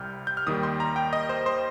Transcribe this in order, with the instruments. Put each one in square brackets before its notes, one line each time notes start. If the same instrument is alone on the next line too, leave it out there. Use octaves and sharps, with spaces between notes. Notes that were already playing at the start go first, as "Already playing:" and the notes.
Already playing: [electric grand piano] C2 C3 G3 F6 G6
G6
F6
D#2 D#3 G3 D#6
C6
A#5
G5
D#5
C5
C5